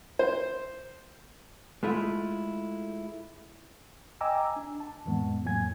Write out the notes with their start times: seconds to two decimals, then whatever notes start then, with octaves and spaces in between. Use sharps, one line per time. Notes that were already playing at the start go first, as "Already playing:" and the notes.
0.19 C5
1.83 G#3 A3 E4 F4
4.21 D#5 G5 G#5 A#5 D6 E6
4.45 G#5
4.56 D4
4.80 A5
5.06 F2 A2 E3 G#3 B3
5.45 F2 A2 F#3 A#3 G#5 G#6